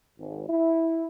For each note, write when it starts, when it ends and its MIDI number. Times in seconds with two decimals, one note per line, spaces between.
0.18 0.48 32
0.48 1.07 64